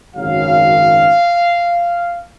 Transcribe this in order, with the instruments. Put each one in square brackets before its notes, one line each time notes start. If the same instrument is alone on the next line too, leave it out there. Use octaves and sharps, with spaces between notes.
[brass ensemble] G#1 F#2 C#3 F#3 F5